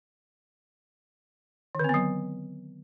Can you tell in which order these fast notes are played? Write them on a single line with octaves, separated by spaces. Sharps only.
D#3 D3 C4 B3 F#3